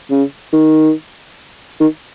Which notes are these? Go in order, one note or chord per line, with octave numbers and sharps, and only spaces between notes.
C#3
D#3
D#3